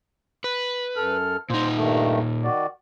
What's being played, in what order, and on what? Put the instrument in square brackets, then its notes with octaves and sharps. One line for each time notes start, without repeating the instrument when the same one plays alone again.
[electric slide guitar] B4
[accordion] F#2 A4 F6
[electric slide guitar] A#2 D#4 [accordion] C5
[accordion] G2 D#3 A3
D#3 F#4 D5